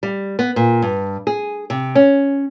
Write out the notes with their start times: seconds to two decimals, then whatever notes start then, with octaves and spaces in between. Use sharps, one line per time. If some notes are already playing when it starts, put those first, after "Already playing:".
0.03 G3
0.39 B3
0.56 A#2
0.82 G2
1.27 G#4
1.70 C3
1.95 C#4